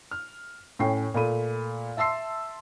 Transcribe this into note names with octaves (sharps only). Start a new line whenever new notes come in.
F6
A2 C#4 G5 C7
A#2 A3 B5 D#7
E5 A5 C6 E6 C7